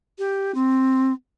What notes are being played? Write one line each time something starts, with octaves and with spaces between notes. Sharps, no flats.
G4
C4